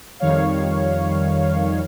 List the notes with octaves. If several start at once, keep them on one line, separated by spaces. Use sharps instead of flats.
F2 D#3 G3 C#5 F5